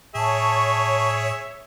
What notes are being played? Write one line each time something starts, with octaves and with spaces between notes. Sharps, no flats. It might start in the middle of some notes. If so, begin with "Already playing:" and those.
A2 G#4 C#5 E5 A5 C#6